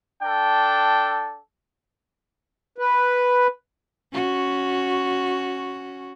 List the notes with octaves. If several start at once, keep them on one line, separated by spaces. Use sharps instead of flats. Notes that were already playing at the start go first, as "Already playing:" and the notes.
D4 A4 G5
B4
C#4 F#4